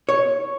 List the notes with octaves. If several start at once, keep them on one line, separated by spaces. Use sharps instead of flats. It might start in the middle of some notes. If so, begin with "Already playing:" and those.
C#5